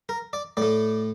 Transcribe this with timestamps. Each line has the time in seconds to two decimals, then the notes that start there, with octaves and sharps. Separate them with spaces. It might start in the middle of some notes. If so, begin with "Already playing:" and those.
0.09 A#4
0.33 D5
0.57 A2 A3 D5